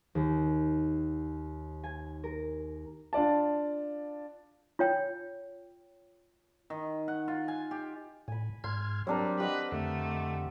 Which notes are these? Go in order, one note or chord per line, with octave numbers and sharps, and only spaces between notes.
D#2
G#5
A#4
D4 F4 D5 A5
F4 C#5 G5
D#3
F#5
F4
G#5
G4
A2 G#5 B5
G#2 C6 F6 G#6
F#3 G3 C4 D4 A#4
G4 B4 D#5 F#5
F2 D3 A3